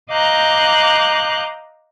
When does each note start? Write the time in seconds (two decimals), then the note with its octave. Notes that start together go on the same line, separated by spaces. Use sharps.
0.11 D#5 F5 A#5 D6 F#6 G6